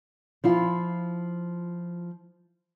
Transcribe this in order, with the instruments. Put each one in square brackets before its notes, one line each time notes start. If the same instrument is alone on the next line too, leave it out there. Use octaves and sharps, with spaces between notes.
[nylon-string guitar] F3 E4 F4